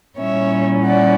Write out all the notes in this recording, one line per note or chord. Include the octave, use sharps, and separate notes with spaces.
A#2 G3 C#4 E4 C#5 E5
D5 F#5